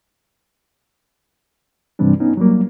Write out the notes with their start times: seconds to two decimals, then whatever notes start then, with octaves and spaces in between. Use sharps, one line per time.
1.99 G2 C3 E3 G3 C4 D4
2.20 B3 C#4 D#4
2.37 F#3 G3 A#3